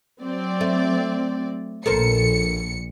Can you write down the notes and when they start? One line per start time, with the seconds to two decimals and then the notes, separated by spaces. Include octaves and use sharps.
0.22 F#3 C4 D5
0.61 A3
1.86 A#1 A4 A#4 C5 C#7